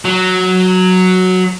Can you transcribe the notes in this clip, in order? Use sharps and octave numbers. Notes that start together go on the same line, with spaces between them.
F#3